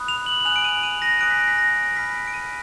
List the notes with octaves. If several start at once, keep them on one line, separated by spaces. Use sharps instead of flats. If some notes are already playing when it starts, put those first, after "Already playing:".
Already playing: B5 D#6 F#6
F7
F#7
F#7
G#5 D#6 F#6 F7
D7
D#7
D#7
A#6
G#5 D#6 F#6 D7
B6
A#6
B6
A#6
B5 F6 B6
D7
D7
D#7